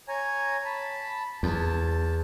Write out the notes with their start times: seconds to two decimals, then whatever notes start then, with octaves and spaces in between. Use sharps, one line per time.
0.08 C#5 G#5 A#5
0.65 A5 B5
1.43 E2 A5